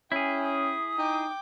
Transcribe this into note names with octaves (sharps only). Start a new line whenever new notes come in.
C#4 E4 G#4 G5
D#6
D#4 G5 D6